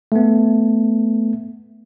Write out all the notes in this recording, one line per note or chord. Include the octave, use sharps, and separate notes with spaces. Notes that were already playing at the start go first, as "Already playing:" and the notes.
A3 B3